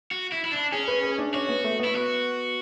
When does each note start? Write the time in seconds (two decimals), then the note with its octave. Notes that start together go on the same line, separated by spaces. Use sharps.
0.11 F#4
0.32 E4
0.44 E4
0.52 D4
0.72 C#4 G#4
0.88 B4
1.03 G#4
1.18 D4
1.34 C#4 F#4
1.49 B3
1.64 A3
1.80 B3 E4
1.95 F#4